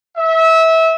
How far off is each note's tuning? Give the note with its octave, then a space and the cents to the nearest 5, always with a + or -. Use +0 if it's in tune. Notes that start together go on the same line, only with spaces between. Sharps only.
E5 -25